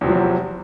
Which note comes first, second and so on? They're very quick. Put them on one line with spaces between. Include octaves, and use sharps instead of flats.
E2 C3 F3 F#3